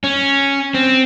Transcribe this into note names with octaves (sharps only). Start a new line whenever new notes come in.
C#4
C4